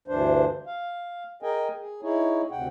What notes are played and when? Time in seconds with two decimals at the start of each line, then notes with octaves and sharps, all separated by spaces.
0.08 D2 G2 E3 D4 C5
0.67 F5
1.42 G#4 A#4 D#5 G5 G#5
1.79 G#4
2.03 D#4 E4 G#4 C#5
2.51 D2 C3 F#5 G5